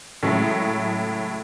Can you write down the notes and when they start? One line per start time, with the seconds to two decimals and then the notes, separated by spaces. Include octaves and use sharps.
0.23 A2 C#3 F#3 G#3 A3